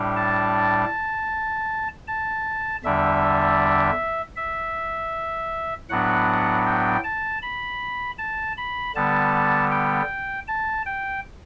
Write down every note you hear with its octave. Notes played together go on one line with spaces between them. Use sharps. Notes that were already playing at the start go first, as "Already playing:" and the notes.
Already playing: A2 G3 D4
A5
A5
E2 D3 G3 D4 E5
E5
A2 F#3 B3 D4 F#5
G5
A5
B5
A5
B5
D3 G3 B3 A5
G5
A5
G5